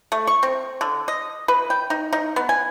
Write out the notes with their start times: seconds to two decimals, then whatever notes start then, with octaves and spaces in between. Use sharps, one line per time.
0.12 A3
0.27 C#6
0.43 C4
0.81 D3
1.08 D#5
1.48 B4
1.70 G5
1.90 D#4
2.13 D#4
2.36 B3
2.49 G#5